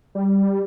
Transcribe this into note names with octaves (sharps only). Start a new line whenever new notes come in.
G3